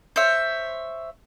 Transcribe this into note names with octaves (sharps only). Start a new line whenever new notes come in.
C5 C#5 E5